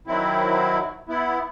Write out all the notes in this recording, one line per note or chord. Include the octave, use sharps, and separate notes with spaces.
D#3 F#3 C4 E4
B3 E4